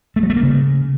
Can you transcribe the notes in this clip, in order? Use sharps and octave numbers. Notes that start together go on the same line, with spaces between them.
A3
F#3
A3
A#3
C#3